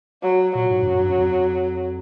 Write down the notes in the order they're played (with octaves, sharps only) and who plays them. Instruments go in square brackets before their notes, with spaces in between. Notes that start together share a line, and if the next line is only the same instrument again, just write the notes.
[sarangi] F#3
[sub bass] A#2 [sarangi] F#3
[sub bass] G#2
G2
F#2
G2
F#2
F2